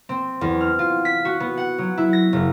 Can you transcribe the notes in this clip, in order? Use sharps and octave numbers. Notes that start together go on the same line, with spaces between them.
C4
E2
F6
F4
B6
F#4
B3
F#5
F#3
E4
A#6
F#1